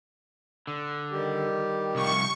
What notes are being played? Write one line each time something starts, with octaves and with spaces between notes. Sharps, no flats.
D3
D#3 G3 G4
C2 F3 C#6